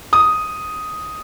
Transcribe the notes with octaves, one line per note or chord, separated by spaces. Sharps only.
D#6